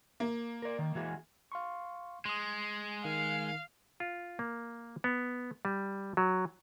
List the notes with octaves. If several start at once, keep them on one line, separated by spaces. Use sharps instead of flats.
A#3
A#4 D5
D#3
E3 F#4 G#4
F5 C6 C#6
G#3 C6 D#6
D#3 F5
F4
A#3
B3
G3
F#3